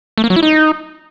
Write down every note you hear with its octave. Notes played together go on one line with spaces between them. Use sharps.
A3
A#3
F#3
E4
D#4